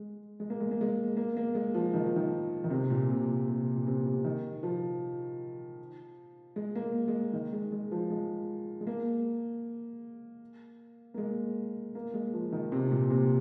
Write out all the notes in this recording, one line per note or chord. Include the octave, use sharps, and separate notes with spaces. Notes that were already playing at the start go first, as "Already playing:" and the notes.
Already playing: G#3
G#3
A#3
G#3
A#3
G#3
A#3
A#3
G#3
F3
D#3
F3
D#3
D#3
C3
A#2
C3
A#2
C3
A#2
C3
C3
D#3
F3
G#3
A#3
G#3
G#3
D#3
G#3
G#3
F3
G#3
G#3
A#3
A#3
G#3
A#3
G#3
F3
D#3
C3
A#2
C3